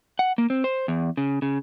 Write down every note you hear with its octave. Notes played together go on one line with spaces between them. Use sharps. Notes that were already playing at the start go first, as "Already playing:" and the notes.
F#5
A#3
C4
C5
E2
C#3
C#3